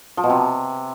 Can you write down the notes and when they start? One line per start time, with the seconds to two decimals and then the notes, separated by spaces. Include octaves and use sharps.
0.17 F3
0.24 B2
0.30 C3